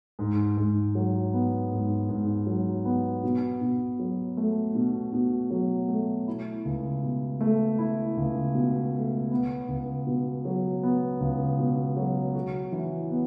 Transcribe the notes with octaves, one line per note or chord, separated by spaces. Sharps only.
G#2
G#2
F#3
B3
G#2
G#2
F#3
B3
B2
B2
F#3
A3
B2
B2
F#3
A3
E4
C#2
B2
A3
E4
C#2
B2
A3
B3
C#2
B2
F#3
B3
C#2
B2
F#3
F#4
E3
B3